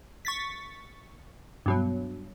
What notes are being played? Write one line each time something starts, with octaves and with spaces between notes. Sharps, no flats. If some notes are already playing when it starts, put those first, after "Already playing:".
C#6 A6 B6
G2 B2 F#3